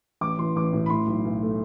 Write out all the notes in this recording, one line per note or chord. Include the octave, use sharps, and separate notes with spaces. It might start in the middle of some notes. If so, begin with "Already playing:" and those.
A1 D6
E3 C6
A1 D6
A2
B5
A2 C6
B1
B1
A3